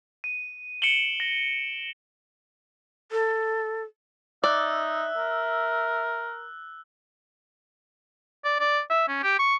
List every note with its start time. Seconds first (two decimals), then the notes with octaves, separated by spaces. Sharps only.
0.24 D#7
0.82 C#7 D7 E7 F#7 G7
1.20 A#6
3.12 A4
4.44 D#4 D5 E5 E6 F#6
5.17 A#4
8.44 D5
8.60 D5
8.90 E5
9.08 C#4
9.23 G4
9.39 C#6